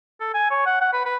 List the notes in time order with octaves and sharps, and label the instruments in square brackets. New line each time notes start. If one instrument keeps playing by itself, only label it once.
[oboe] A4
G#5
C#5
F#5
F#5
B4
B4